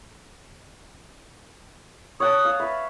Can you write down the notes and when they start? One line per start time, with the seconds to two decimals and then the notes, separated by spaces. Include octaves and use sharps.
2.20 C#5 F#5 A5 D#6
2.45 F5
2.60 B4 E5